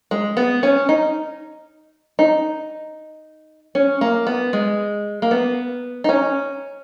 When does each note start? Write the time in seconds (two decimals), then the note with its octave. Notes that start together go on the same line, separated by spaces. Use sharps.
0.11 G#3
0.37 B3
0.63 C#4
0.89 D#4
2.19 D#4
3.75 C#4
4.01 A#3
4.27 B3
4.53 G#3
5.22 A#3
5.31 B3
6.04 D#4
6.09 C#4